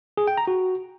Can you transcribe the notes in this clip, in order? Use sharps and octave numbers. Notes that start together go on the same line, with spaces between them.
G#4
G5
A#5
F#4